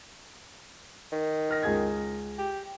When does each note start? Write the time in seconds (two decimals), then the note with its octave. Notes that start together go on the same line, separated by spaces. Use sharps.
1.12 D#3
1.49 A#4 F6 A#6
1.63 C#2 G#4 G#6
2.38 G4